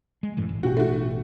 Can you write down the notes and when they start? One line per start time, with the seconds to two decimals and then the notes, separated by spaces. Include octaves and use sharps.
0.23 G#3
0.37 F#2 A2 E3
0.49 G#1
0.63 A1 B2 B3 F#4 G4
0.77 A3 F#4